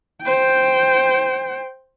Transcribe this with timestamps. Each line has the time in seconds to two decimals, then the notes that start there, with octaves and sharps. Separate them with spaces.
0.22 C5 G5